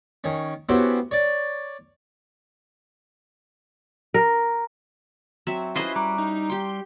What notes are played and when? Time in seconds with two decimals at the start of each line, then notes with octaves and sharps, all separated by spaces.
0.24 D#3 C#4
0.69 B3 C#4 E4 F#4 G4 C5
1.11 C#5 D5
4.14 A#4
5.47 F#3 C4 E5
5.76 C#4 E4 F4 B4 C5 D#5
5.96 G3 A#5 D6 F#6
6.18 D#4
6.50 G4 G5 C6